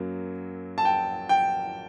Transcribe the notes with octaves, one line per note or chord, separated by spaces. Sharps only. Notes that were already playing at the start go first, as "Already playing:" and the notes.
Already playing: F#2 F#3 A#3
A5
G5
G5